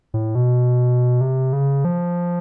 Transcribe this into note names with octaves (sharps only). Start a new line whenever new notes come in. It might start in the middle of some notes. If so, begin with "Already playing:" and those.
A2
B2
C3
C#3
F3